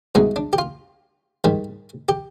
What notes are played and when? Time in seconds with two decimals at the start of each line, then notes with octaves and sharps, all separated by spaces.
0.15 C2 B2 G#3 D#4
0.36 D4
0.53 G4
0.58 F4
1.44 G#2 D#3 G3
2.09 G4